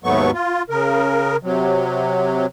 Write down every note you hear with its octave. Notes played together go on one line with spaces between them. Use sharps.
D#2 G#2 F#3 A3 B3 C#6
F4
C#3 A#4
C3 F#3